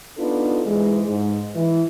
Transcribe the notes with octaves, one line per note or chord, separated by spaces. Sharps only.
B3 D4 D#4 F4 A4
G#2 E3 G#3
G#2
E3